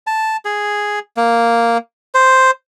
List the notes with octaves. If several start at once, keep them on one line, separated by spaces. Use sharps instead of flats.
A5
G#4
A#3
C5